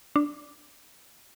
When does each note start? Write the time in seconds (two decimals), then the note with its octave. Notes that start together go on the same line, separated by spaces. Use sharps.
0.16 D4